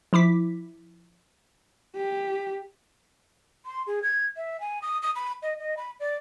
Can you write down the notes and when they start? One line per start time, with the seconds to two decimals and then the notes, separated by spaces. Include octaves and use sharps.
0.13 F3 E4 D6 B6
1.96 G4
3.65 C6
3.87 G#4
4.03 G#6
4.37 E5
4.60 G#5
4.82 D#6
5.02 D#6
5.16 B5
5.42 D#5
5.59 D#5
5.77 B5
6.00 D5